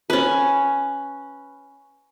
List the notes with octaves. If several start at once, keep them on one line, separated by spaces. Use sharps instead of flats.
C#4 B4